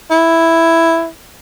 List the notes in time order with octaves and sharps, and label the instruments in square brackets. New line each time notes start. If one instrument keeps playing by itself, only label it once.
[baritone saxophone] E4